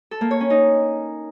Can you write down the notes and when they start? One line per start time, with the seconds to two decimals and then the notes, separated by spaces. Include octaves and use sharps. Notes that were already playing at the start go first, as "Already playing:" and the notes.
0.11 A4
0.21 A#3
0.31 C#5
0.40 C#4
0.50 D#4